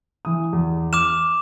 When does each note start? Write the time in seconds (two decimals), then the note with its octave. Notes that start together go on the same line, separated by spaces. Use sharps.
0.25 E3 D#6
0.53 E2
0.93 D6 F6 E7